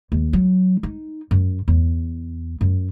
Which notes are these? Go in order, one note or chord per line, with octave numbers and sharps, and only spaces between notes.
D#2
F#3
D#4
F#2
E2
F#2